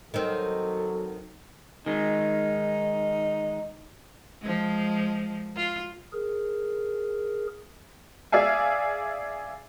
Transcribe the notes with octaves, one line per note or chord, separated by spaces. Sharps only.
D#3 F#3 C4 A4
D#3 G#3 D#4
F3 G#3
F4
G#4 A#4
G#4 D5 E5 F5 G#5